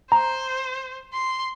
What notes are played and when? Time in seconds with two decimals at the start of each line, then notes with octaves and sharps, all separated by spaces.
0.12 C5 A#5
1.13 C6